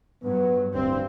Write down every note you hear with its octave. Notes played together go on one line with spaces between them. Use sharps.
G2 F#3 B3
D1 G2 C4